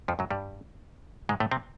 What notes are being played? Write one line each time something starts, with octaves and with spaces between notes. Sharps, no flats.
F2 F3
F#2 F#3
G2 G3
G#2 G#3
A2 A3
C3 C4